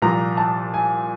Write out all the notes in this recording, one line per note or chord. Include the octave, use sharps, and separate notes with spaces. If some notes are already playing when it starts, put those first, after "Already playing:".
C2 A#2 F3 A#5
A5
G#5